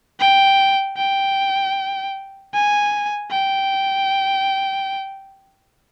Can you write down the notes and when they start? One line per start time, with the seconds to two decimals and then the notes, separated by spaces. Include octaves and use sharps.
0.20 G5
0.97 G5
2.54 G#5
3.32 G5